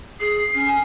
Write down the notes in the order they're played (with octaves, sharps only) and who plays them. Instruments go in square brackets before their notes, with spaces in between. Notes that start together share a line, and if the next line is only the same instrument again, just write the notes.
[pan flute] G#4 [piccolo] C7
[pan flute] C#4
[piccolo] G#5